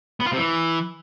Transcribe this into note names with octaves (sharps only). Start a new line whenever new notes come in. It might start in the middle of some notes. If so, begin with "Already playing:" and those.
B3
F4
C3
E3